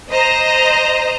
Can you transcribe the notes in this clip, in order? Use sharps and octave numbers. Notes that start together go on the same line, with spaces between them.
C5 D#5 A#5